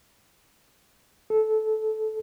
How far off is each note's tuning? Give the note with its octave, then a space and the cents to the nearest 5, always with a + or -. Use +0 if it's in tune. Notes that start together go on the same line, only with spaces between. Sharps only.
A4 -15